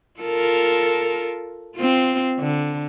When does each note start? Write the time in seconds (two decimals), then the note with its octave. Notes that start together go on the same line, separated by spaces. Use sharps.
0.20 F4 A4 A#4
1.76 C4 F4
2.39 D3